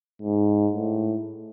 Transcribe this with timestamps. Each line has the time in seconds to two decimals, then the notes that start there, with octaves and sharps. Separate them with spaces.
0.22 G#2
0.73 A2